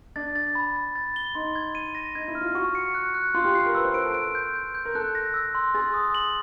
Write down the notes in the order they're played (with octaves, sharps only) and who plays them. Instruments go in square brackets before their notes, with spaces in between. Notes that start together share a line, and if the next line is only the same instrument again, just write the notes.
[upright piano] D4 [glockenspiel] A6
[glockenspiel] A6
B5
A6
A6
G7
[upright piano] D#4 [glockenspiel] C6
[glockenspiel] G#6
D#7
A#6
[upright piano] D#4 [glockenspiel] G#6
[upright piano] E4
[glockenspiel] F6
[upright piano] F4
[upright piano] F#4 [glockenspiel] C#6
[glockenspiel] C#7
F#6
F#6
[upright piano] F4 [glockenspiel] C6
[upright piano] G4
[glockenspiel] C7
[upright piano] A#4
[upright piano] B4 [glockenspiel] E6
[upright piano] C5
B4
[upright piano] A#4 [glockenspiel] D7
[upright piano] A4
[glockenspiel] D7
G6
G6
G6
[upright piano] A#4
[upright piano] A4 [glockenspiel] F#6
[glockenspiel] A#6
E6
C6
[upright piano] G#4 [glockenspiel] A6
[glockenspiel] D#6
F#7